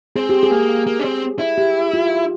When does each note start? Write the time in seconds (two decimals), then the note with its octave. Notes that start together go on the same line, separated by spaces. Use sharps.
0.16 C4 G#4
0.29 G4
0.43 G#4
0.51 A#3
0.87 A#3
0.99 C#4
1.04 C4
1.39 E4
1.58 G4
1.93 F4